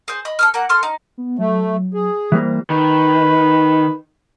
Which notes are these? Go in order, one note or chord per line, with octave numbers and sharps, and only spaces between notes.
G#4 C5
D#5 B5
A4 D#6 F6
A#3 F#5
A4 C6 F6
D#4
B3
F#3 A3
G#4
E3 G3 A#3 C5
D#3 B4